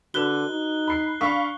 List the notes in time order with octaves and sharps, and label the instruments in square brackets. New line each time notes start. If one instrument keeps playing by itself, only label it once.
[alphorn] D3 [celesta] F#4 B4 [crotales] F#6 G7
[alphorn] D#4
[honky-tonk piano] B5 C7
[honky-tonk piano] D4 F5 C#6 [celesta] B5 B6